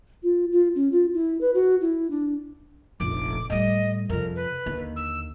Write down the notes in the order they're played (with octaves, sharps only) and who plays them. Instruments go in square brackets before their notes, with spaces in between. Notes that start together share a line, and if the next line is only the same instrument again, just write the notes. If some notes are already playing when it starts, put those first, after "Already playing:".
[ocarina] F4
F4
C#4
F4
E4
B4
F#4
E4
D4
[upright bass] F1 A#1 [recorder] D6
[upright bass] A2 G3 [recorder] D#5
[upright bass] F2 C3 [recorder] A#4
[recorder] B4
[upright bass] D#2 D3
[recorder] E6